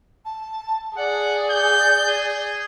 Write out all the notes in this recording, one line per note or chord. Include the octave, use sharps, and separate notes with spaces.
A5
G#4 D5 F#5
G6
G#4